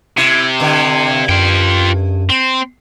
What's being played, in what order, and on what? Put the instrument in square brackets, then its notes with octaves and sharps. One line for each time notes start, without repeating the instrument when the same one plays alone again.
[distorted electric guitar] C3 [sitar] E4
[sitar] G2 D3
[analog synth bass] F#2 [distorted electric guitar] F4 G5
[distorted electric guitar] C4